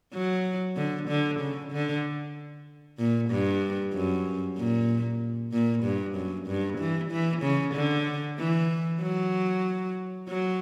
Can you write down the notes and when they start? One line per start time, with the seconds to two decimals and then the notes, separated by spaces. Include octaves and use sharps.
0.13 F#3
0.76 D3
1.09 D3
1.40 C#3
1.72 D3
2.98 A#2
3.30 G2
3.94 F#2
4.57 A#2
5.53 A#2
5.84 G2
6.15 F#2
6.47 G2
6.79 E3
7.11 E3
7.42 C#3
7.74 D3
8.38 E3
9.01 F#3
10.28 F#3